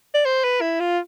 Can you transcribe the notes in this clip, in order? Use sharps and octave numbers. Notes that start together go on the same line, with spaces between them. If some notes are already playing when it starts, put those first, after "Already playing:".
D5
C5
B4
E4
F4